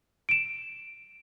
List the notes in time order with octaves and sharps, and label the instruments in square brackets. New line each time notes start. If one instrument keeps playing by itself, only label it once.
[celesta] D7 E7